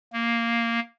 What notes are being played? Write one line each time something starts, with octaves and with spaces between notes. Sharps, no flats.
A#3